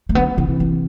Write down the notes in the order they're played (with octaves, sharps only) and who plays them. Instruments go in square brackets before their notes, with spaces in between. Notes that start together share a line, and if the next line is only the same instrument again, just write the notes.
[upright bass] A3
[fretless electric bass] D3 F#3 [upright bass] B3
[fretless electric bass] C3 E3 [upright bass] C4
[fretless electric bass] C3 E3
[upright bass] B3